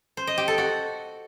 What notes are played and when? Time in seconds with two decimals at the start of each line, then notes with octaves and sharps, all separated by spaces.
0.17 C5
0.27 D#5
0.38 G4
0.48 A4
0.58 F#4